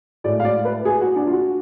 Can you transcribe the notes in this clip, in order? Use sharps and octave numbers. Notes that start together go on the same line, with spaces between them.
A2 G#3 D5
F5
D5
B4
G#4
F#4
D4
F4
F#4